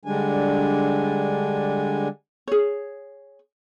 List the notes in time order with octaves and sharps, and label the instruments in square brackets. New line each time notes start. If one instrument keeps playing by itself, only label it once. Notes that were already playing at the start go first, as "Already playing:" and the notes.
[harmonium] D3 G3 G#3 D4 G#5
[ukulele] G#4 C#5